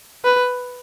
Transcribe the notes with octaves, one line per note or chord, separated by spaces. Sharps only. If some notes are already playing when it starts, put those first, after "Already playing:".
B4